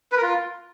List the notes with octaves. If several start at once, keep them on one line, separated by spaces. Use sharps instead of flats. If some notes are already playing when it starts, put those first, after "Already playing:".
B4
A#4
F4